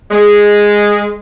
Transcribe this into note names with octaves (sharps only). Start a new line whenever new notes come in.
G#3